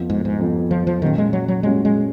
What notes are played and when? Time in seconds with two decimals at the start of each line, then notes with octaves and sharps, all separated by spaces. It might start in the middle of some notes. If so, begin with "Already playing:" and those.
Already playing: F2 F3 B3 F4
0.10 G#2
0.25 G#2
0.40 F2 F3 B3 F4
0.71 F3
0.87 F3
1.02 A#2 D#3 F#3 C#4 F#4
1.18 G#3
1.33 F#3
1.48 F#3
1.63 A#2 F#3 G#3 C#4 F#4
1.85 G#3